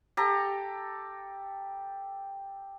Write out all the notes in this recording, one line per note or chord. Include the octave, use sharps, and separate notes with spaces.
G4 A4 A#5